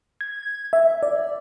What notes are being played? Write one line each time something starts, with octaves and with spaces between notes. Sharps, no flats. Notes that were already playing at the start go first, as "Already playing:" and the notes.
G#6
E5
D5